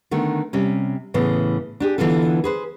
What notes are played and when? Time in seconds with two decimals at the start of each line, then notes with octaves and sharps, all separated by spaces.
0.11 D3 D#3 A3 B3
0.53 C3 G3 C#4
1.14 A2 C#3 E3 B3
1.80 D4 G4 G#4
1.98 D3 E3 B3 D4 F4 A4
2.44 G#4 B4 C5